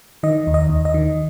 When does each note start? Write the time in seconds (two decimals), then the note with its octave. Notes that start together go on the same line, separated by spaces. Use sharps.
0.23 D#3 D#5
0.47 D#2
0.54 D#5
0.70 D#2
0.85 D#5
0.94 D#3